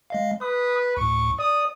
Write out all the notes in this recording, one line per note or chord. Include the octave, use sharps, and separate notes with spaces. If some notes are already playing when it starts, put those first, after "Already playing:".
G#3 D#5 F5
B4 D#6
D2 A2 C#6
D5 D#6